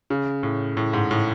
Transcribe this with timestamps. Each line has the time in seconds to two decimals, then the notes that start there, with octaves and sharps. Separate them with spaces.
0.10 C#3
0.43 A2
0.77 A2
0.93 G#2
1.11 A2